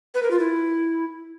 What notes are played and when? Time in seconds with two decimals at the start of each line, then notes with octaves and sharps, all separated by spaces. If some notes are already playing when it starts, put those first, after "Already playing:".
0.14 B4
0.23 A#4
0.31 F4
0.39 E4